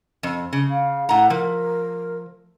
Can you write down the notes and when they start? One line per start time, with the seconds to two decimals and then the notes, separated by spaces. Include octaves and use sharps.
0.23 F2
0.53 C#3
0.71 F5
1.09 A2 F#5 A#5
1.30 F3 A#4